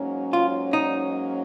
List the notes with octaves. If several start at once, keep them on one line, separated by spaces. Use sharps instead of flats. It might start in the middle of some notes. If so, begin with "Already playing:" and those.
Already playing: G#2 F#3 A#3 C#4
F4
D#4